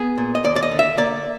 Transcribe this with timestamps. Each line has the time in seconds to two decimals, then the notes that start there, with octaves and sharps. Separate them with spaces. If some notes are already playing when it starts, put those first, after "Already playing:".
Already playing: B3 G#4
0.18 A#2
0.35 D#5
0.44 D#2 D5
0.56 D5
0.63 D#5
0.71 D3
0.79 E5
0.97 A#3 D5